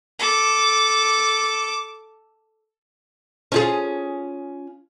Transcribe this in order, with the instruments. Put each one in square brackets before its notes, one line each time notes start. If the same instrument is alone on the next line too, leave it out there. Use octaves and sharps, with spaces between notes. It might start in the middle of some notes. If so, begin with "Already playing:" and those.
[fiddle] A4 D6
[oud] C#4 F4 G#4